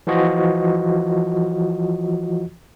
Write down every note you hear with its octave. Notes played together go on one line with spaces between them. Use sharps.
E3 F3 F4 F#4 D#5